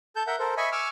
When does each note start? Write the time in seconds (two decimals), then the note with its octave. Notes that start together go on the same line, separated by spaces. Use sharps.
0.16 A4 A5 G6
0.27 A#4 E5 F#5 G6
0.39 A4 A#4 C5
0.57 D#5 E5 G#5 B5 C#6
0.72 G#5 C#6 D6 E6 F6